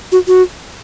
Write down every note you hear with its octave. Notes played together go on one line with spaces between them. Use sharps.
F#4
F#4